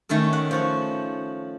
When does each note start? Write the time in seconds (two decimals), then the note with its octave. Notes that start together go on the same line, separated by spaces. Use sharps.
0.09 D#3 A3 C#4 A4
0.33 F#5
0.51 F3 F#4 F#5